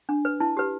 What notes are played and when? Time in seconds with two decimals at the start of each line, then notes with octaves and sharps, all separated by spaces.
0.09 D4
0.25 B4
0.40 E4 A5
0.57 G4 B4